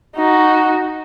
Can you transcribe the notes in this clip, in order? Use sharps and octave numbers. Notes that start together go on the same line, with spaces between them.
D#4 F#4